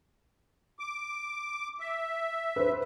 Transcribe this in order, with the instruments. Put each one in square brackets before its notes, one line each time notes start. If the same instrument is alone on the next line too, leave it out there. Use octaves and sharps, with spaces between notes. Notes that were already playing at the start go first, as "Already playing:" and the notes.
[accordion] D6
E5
[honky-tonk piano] B4 C5